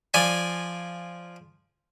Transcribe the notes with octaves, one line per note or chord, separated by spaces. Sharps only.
F3 D5 G#5